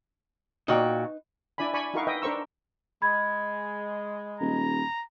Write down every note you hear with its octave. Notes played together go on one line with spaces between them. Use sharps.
A#2 D#4 F#4 B4 G5
D4 E4 D5 G#5 B5
D5 G#5 B5 C#6
D#4 E4 F#4 A#4 F5 C#6
B4 D#5 E5 G5
D4 A#4 C5 C#6 E6
G#3 B5 G#6
D#1 A#5